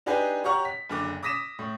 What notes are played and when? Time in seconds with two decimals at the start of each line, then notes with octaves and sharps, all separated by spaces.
0.06 D4 D#4 G4 G#4 B4 G#5
0.44 G4 C#5 F#5 A#5 C#6
0.65 B6
0.89 F#1 D3 D6
1.23 D6 D#6 A#6 B6 D#7 E7
1.59 A2